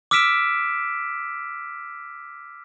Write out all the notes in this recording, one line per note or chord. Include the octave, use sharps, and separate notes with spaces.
D6 E6 F6 B6 D7 E7